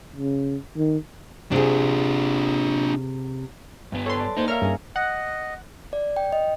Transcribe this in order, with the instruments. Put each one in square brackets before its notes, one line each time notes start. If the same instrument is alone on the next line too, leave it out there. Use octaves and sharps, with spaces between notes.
[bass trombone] C#3
D#3
[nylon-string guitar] C3 G#4 [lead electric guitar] D4 F4
[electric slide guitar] G2 B3
[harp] A4 B4 [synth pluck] C#5 C6
[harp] D5
[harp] A#3 [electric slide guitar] D#4 C5
[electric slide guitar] A#4 [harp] C#5 E5 F5 [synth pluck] F6
[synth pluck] G2 [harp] C#4 D#4 G#4
[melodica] D#5 [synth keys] F#5
[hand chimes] D5
G5
D#5